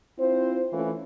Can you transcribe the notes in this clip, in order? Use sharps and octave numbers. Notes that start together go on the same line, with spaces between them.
C4 E4 F4 C5
E3 A3 C#4 E4 F4